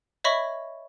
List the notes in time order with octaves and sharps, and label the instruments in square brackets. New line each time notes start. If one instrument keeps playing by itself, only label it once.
[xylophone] C#5 D#5 E5 B5 C#6